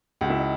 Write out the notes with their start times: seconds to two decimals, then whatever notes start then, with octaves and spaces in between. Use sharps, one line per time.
0.21 C#2 F#4
0.30 E4
0.39 D#4